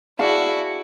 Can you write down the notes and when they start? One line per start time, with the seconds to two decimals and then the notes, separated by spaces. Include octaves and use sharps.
0.19 E4 F#4 G#4 D5 F5 A5